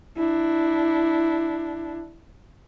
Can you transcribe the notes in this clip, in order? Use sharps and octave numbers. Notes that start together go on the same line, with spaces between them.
D4 E4